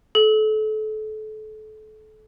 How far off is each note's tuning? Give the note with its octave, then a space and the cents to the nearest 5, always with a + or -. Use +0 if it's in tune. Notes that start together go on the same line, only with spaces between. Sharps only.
A4 -30